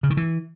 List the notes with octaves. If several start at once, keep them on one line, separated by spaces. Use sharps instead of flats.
C#3
D#3
E3